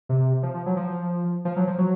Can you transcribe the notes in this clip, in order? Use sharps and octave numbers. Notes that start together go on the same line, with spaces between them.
C3
F3
F3
F#3
F3
F3
F#3
F3
F#3